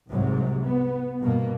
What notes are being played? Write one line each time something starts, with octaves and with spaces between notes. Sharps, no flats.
C2 G#2 C3 F#3
B3
G2 B2 A#3